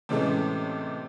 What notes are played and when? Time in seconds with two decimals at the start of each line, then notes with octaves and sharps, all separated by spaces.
0.09 A2 C3 E3 G#3 A3 C#4